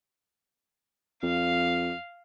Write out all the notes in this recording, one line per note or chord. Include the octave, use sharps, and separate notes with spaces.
F2 F5